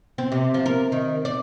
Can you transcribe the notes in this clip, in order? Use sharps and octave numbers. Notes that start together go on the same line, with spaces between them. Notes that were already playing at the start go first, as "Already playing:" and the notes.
C4
C3
F3
A#4
D#3
D5